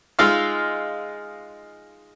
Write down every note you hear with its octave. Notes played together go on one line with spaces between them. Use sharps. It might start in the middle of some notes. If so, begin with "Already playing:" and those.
G#3 D#4 F4 F5 E6 F6